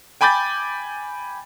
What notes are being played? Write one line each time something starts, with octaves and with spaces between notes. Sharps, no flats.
G5 G#5 B5 D6 G6 A6